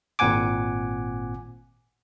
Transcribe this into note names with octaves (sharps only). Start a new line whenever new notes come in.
G#1 A#2 C4 F#5 G#5 D6